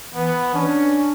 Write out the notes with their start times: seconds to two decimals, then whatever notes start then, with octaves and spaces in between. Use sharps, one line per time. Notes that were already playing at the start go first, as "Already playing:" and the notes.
0.14 E3 B3
0.54 C#4 D4